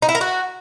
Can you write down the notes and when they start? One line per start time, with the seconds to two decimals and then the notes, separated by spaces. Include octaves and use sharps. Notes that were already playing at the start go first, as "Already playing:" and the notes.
0.02 D#4
0.09 E4
0.15 A#4
0.21 F#4